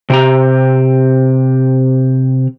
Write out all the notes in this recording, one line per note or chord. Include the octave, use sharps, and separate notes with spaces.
C3 G4 A#5